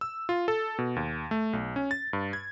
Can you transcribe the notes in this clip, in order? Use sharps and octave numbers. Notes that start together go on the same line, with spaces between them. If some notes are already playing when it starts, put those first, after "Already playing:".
E6
F4
A4
B2
D#2
A3
B1
C#4
A6
G2
G#6